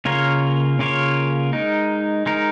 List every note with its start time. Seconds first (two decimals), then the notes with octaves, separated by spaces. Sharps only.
0.05 C#3 A#3 F4 A#4 C#5
0.79 C#3 A#3 F4 A#4 C#5
1.53 G#3 D#4 A#4
2.26 G#3 D#4 A#4